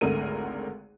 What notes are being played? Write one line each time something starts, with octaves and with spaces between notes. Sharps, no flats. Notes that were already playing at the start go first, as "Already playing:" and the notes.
G#1 C#2 D3 A3 A#4 D#7